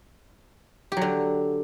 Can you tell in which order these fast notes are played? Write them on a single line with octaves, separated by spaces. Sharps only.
G4 F#3 D3